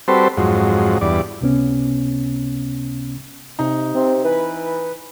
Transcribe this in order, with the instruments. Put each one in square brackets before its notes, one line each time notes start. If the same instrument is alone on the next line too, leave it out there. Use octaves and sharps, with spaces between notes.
[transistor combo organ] G3 C4 F#4 A4 B4 C5
F2 G#2 F#3
E2 G2 D5
[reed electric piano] C#2 C3 B3 C#4
[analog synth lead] C3 [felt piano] D#4
[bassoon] C3 [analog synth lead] C4
[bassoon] E3 [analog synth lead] B4